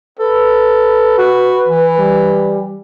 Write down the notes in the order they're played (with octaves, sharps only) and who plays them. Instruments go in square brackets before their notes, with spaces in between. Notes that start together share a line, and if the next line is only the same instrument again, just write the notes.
[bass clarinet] A4 [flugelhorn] B4
[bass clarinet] F#4
E3
[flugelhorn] G3